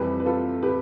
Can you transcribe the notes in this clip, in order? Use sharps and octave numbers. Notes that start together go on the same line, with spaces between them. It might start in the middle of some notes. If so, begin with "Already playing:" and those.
Already playing: F2 C3 E3 G3 G4 B4
B4
F4 A4
G4 B4